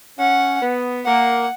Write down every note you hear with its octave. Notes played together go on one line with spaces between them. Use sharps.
C#4 F#5
B3
A#3 F#5